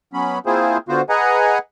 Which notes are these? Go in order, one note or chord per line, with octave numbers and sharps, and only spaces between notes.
F#3 B3 C#4 B5
A#3 C4 E4 F4 G#4 C5
D3 B3 F4 F#4 C5
G#4 B4 D#5 F#5 G#5 A#5